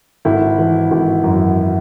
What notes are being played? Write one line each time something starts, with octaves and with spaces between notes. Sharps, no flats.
G#1 E4
E3
G#1
F#2